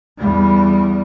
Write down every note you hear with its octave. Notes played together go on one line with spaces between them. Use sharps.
E2 G3